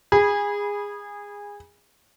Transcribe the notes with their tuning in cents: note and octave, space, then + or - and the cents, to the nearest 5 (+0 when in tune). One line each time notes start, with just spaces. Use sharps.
G#4 -20 B5 -25